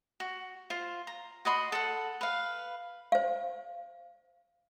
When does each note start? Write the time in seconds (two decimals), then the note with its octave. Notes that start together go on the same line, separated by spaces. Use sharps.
0.20 F#4
0.70 F4 C5
1.07 A#5
1.45 F#4 D#5 B5 C6
1.72 A4 F#5
2.21 B4 F5
3.12 C5 F5